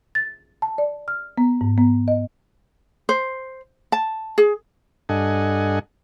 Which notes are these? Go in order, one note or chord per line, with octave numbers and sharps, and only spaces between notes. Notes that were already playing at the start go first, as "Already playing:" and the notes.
A6
A5
D5
F6
B3
G#2
B3
D#5
C5
A5
G#4
G2 D4 A4 D#5 F#5 G#5